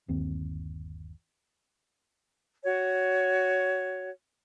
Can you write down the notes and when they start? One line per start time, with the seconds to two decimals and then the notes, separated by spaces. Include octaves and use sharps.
0.08 G1 D#2 C4
2.64 F#4 C#5